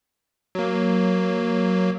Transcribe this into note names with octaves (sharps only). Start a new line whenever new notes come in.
F#3 A#3